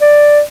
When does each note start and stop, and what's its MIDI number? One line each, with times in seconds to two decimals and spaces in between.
0.01 0.41 74